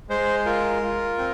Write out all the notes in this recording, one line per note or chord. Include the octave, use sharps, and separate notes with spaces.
G#3 C5
F4 A#4
F4
C4